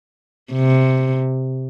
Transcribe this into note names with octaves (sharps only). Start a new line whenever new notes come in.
C3